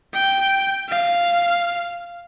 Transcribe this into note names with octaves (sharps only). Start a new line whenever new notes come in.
G5
F5